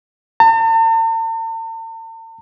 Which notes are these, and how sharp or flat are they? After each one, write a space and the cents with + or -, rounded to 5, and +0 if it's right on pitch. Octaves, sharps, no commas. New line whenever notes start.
A5 +45